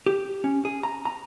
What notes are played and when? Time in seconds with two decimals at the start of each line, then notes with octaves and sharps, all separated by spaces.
0.06 G4
0.44 C#4
0.65 G#4
0.83 A#5
1.05 A#5